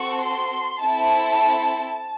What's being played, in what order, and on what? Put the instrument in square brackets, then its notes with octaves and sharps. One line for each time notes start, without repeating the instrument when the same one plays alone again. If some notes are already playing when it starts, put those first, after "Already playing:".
Already playing: [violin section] C4 F#4 A4 C#6
C6
C4 E4 A4 A5